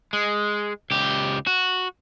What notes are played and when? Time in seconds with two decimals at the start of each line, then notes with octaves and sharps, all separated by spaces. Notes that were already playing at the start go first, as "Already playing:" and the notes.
0.13 G#3
0.91 C#2 G4
1.47 F#4